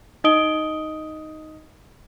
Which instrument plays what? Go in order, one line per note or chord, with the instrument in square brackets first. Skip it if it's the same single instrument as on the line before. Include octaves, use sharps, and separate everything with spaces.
[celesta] D#4 D#5 D#6 D7 G7